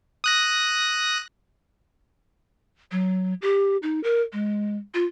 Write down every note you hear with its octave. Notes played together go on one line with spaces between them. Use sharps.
D#6 F#6 A#6
F#3
G4
D#4
A#4
G#3
F4